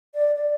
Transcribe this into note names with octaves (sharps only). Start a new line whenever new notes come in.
D5
D5